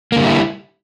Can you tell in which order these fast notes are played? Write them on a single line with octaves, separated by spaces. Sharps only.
A#3 D3 G3 E4